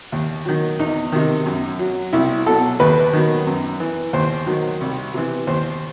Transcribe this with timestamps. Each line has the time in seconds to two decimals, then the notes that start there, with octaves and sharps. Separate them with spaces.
0.12 D#2
0.45 D#3 F#3
0.79 E2 D#4
1.12 C3 D#3
1.46 F#2
1.79 F#3
2.13 C2 E4
2.46 B2 F#3 A4
2.80 D#2 B4
3.13 D#3 F#3
3.47 F#2
3.80 E3
4.13 D#2 C5
4.46 D#3 F#3
4.81 C2
5.14 C3 E3
5.47 D#2 C5